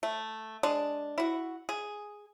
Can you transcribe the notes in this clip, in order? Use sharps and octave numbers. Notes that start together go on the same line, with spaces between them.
A3
G#3 D4
E4 F#4
G#4